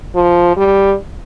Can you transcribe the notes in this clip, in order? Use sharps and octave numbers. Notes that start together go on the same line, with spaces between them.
F3
G3